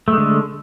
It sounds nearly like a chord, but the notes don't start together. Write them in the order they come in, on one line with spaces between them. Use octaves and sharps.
A3 G#3 D3